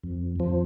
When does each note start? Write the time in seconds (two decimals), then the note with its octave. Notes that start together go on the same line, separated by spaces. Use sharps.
0.04 F2
0.40 F2 F3